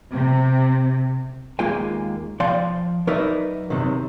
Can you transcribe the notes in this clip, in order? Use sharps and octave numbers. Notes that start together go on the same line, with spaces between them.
C3
D#2 G#3 A#3 F4 G5 G#5
F3 D5 F5 G5 C6
F#3 D#4 A#4 B4 D5 E5
F#2 C3 D#3